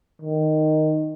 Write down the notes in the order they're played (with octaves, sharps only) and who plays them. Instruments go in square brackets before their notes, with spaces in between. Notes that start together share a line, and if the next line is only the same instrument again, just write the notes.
[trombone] D#3